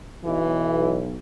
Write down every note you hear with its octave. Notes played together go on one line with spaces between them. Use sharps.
B1 E3